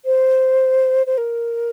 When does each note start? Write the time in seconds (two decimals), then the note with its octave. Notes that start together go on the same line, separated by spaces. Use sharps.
0.05 C5
1.07 C5
1.18 A#4